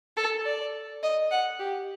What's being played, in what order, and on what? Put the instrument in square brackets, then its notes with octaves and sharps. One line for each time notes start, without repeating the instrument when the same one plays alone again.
[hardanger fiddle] A4
D5
D#5
F#5
G4